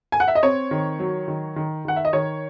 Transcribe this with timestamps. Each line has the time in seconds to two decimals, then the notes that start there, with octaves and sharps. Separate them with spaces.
0.12 G#5
0.20 F#5
0.28 E5
0.35 D#5
0.43 C4 C#5
0.71 D#3
0.99 F#3
1.28 D#3
1.56 D#3
1.85 D#3 F#5
1.96 E5
2.05 D#5
2.13 D#3 C#5